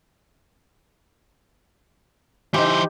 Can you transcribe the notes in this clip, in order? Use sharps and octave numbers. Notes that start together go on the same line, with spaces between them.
E3 D#4 G4 C5